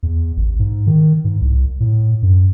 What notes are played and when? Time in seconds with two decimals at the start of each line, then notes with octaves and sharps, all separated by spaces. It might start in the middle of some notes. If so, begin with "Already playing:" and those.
0.03 E2
0.37 A1
0.59 G#2
0.86 D#3
1.24 G#2
1.41 C2
1.80 A2
2.22 F#2